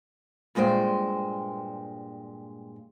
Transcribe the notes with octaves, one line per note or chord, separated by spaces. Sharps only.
G2 A#2 G#3 C5 G5